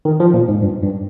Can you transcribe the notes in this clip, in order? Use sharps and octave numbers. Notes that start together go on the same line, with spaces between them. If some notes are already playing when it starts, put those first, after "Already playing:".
D#3
F3
A#2
G#2
G2
G2